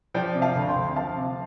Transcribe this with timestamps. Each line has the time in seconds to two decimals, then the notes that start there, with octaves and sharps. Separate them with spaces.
0.14 F3 D5 G5
0.35 C3
0.42 F5 A5
0.55 D2
0.69 G5 C6
0.76 D2
0.96 F3 F5 A5
1.16 C3